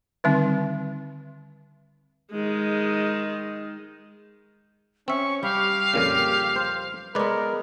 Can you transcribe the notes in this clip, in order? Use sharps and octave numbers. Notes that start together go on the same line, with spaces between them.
D3 D#3 G3 C4 D#4
D#3 G#3
C4 C#4 E5 C#6
G3 G4 F5
F2 A#2 C#3
C5
G#3 B3 A#4 B4 D5